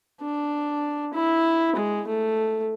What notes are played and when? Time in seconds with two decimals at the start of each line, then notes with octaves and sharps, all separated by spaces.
0.21 D4
1.13 E4
1.75 G#3
2.07 A3